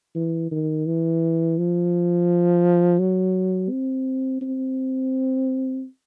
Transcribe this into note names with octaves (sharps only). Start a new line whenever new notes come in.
E3
D#3
E3
F3
F#3
C4
C4